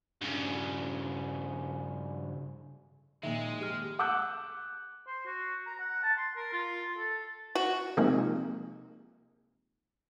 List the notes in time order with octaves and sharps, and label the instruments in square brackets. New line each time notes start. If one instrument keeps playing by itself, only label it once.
[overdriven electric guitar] G2 C#3
[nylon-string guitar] F2 A#2 [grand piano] D#3 [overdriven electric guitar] G#3 [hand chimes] E5
[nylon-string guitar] F2 G#2 [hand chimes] G4 G#4 F6
[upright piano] F#5 D6 E6 F#6 G6
[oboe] C5
F#4
A#5
F#5
A5
C6
A#4
F4
A4
[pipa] F#4
[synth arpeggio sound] C3 F3 G#3 A#3 C4 D#4